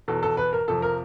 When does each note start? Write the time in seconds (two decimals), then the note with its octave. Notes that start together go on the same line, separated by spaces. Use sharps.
0.08 E2 B2 A4
0.23 A4
0.37 B4
0.53 A#4
0.67 F2 C3 F3 A4
0.82 A#4